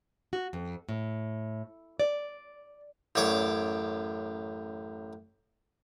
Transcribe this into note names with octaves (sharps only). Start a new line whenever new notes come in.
F#4
F2
A2
D5
A1 F#2 C#5 D5 D6